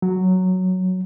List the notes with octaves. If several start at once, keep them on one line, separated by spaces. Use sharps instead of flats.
F#3